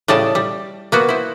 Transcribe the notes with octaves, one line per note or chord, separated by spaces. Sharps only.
A2 C#3 G3 D5 D#5 A5
G3
A#3 B3 F#4
E4 C5